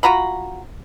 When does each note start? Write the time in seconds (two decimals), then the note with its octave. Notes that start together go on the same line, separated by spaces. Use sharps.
0.03 F4 F#4 A#5 B5